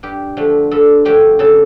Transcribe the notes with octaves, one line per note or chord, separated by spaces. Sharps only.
G2 G4
D3 F3 A3
G2 A4
D3 F3 A3 G4
C#3 A4